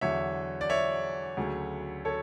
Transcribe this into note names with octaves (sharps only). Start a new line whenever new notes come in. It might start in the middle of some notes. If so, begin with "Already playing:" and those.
E2 D3 F#3 C#5 E5
D5
C#5 E5
D2 C#3 F#3 A3
A4 C#5